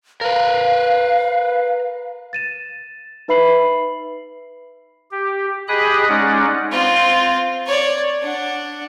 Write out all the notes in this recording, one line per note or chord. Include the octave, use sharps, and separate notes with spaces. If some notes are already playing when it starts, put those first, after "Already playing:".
A#4 B4 F5
A6 D#7 E7
D#4 B4 E5 B5 C7 F#7
G4
G4 G#4 D#5 B5 D#6 F#6
G#3 C#4 D#4 D5 F#5
C4 F4
C#5 D5
D4 F#5